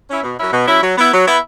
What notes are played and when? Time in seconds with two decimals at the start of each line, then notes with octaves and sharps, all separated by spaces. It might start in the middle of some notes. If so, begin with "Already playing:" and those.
0.09 C#4 E4
0.23 B2
0.39 F#3 C#4 E4
0.52 B2
0.67 F#3 C#4 E4
0.82 F#3
0.97 B3 E4
1.13 F#3
1.27 B3 E4